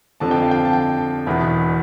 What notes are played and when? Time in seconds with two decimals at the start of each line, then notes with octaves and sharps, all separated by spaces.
0.20 F2 D3 F3 A5
0.31 G5
0.42 F5
0.51 G5
0.65 A5
0.73 G5
1.26 E1 E2 B2 B3 E4